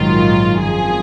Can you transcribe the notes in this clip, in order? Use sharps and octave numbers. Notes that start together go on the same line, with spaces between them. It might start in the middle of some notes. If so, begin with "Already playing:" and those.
Already playing: A#1 G#2 D#3 F#3 F4
G#1 F#2 F3 G#4